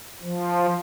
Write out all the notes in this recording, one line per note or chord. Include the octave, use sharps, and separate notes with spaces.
F3